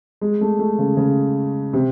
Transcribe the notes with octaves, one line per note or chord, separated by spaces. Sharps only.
G#3
A3
A3
C#3
C#3
C3